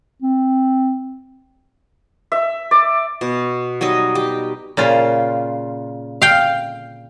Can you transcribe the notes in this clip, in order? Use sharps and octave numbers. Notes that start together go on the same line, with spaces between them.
C4
E5
D5
B2
F#3 G3 D#4 D#5
G4
A#2 C#3 F4
F5 G5